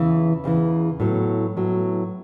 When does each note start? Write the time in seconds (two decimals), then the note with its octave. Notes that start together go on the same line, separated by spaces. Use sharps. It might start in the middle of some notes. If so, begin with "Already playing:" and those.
Already playing: E2 C#3 E3
0.44 E2 C#3 E3
1.00 A2 F#3 B3
1.57 A2 F#3 B3